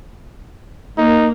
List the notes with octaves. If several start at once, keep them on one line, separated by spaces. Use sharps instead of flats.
A#3 D#4